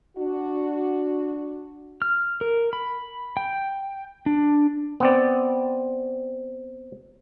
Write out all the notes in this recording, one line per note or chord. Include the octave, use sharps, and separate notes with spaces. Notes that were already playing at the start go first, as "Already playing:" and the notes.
D4 F#4
F6
A#4
B5
G5
D4
B3 C4 D5